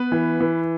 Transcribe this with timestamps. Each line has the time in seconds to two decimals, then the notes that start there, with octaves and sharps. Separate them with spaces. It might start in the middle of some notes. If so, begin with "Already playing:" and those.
Already playing: B3 B4
0.12 E3
0.40 E3